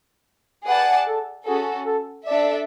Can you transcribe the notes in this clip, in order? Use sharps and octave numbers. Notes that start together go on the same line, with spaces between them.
G#4 B4 D5 F#5 A5
A4
C#4 F#4 G#4 A4
A4
D4 A4 D5 E5